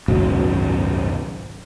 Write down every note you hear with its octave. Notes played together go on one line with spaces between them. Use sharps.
G#1 C#2 F#2 B2